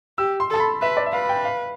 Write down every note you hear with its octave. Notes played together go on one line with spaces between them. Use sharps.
G4 E6
C6
A4 A5
B5
B4 E5
D5
E5
B4 F5
G5
F5